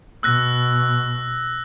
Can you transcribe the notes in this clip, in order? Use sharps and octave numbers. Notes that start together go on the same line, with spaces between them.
B2 E6 F#6 A#6